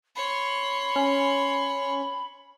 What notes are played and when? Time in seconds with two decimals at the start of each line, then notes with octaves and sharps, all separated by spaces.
0.16 C#5 B5 C6
0.96 C#4